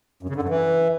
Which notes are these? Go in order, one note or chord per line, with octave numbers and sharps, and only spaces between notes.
F#2
C#3
D3
F#2
E3